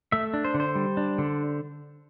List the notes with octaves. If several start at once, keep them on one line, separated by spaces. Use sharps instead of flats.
A3 E5
D4
C5
D3
C5
G3
D4
D3